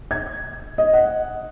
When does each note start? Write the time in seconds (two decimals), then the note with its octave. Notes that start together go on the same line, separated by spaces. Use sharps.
0.11 G#6
0.78 D#5
0.93 F#5